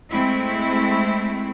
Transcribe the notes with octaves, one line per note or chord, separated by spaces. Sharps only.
G#3 A3 C4 E4